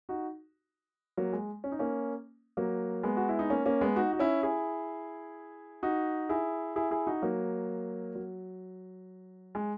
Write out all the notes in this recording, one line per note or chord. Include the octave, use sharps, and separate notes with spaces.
D#4 F#4
F#3 A#3
G#3
C#4
D#4
A#3 C#4
F#3 A#3
G#3 B3
F#4
E4
D#4
A#3 C#4
A#3 C#4
G#3 B3
D#4 F#4
F#4
C#4 E4
E4 G#4
D#4 F#4
E4 G#4
E4 G#4
E4 G#4
D#4 F#4
F#3 A#3
F#3
G#3